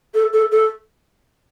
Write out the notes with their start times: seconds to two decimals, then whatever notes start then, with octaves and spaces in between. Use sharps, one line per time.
0.14 A4
0.33 A4
0.51 A4